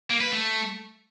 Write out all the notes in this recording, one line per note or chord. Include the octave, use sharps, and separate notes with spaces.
A#3
B4
A3